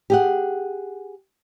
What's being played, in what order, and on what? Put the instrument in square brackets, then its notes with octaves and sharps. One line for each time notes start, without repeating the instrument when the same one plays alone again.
[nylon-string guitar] G4 G#4 F#5